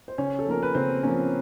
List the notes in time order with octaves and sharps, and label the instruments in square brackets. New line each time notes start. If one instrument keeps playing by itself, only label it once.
[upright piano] C5
C#3 C#4 C#5
A4
F3 A#3 C#4 A#4
B4
C#3 C4 C5
F3 A#3 C#4